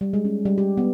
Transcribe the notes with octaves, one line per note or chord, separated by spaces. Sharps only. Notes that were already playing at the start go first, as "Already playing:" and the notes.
G3
G#3
C#4
G3
G4
B3